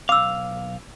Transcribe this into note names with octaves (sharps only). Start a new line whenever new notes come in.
B1 F5 D6 E6